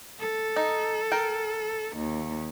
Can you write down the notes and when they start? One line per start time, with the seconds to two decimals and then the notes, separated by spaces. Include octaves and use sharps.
0.19 A4
0.56 D#4
1.12 A#4 G5
1.97 D#2